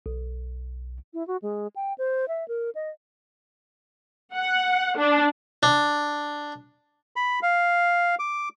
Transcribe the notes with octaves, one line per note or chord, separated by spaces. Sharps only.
B1
E4
F#4
G#3
G5
C5
E5
A#4
D#5
F#5
D4
D4
B5
F5
D6